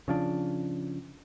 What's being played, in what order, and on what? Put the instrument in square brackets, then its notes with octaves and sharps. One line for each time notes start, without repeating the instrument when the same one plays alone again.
[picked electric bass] C#3 F3 D4